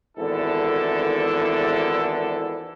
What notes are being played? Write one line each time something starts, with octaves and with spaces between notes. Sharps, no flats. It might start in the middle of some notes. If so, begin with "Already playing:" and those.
G#1 E2 D3 E4 A4